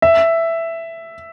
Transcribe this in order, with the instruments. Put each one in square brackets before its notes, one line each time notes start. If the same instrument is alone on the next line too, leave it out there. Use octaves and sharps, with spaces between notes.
[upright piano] E5